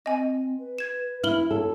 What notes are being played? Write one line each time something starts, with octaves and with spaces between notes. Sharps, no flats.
C4 D#5 G#5
B4
G#6 E7
E4 F6 F#7 G7
A4 C#5